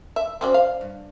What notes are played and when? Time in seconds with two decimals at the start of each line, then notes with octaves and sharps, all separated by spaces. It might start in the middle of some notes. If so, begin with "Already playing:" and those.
0.16 E5
0.41 C4 C#4 F#4 C5 D5
0.54 F5
0.81 G2